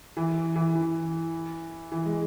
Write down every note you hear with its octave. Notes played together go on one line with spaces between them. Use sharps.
E3
E3
E3
E3
G#3